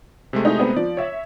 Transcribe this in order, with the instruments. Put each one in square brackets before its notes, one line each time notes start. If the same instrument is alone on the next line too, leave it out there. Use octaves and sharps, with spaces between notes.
[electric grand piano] C3 G#3 A3
[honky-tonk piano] D#4 E4 G#4
B3 C4 D#4
[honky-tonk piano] F3 [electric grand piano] D5
[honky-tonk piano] C#5 E5